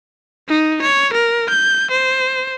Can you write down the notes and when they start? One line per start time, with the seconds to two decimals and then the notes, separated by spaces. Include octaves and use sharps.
0.48 D#4
0.82 C#5
1.13 A#4
1.49 G6
1.91 C5